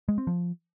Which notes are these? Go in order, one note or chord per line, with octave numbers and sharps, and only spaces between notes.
G#3
C4
F3